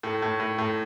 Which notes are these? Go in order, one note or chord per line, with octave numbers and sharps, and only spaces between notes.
A2
A2
A2
A2